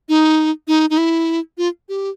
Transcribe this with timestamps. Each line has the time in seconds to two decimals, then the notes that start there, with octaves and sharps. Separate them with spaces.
0.09 D#4
0.68 D#4
0.90 D#4
0.98 E4
1.58 F4
1.89 G4